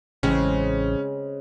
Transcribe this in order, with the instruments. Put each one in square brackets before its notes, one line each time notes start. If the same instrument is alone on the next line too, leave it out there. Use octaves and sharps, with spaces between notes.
[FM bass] A1 [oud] C#3 G#3 C4 [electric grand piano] C#4